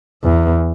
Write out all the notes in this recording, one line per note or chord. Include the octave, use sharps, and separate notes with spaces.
E2